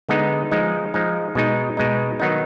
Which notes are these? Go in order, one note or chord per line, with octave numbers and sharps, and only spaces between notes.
D3 G#3 B3 D#4
F3 G#3 D#4
F3 G#3 D#4
B2 G#3 D#4
B2 G#3 D#4
D#3 F#3 B3 D#4